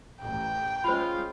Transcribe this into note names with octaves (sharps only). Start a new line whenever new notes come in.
A1 G5
G#3 C#4 F4 C5 B5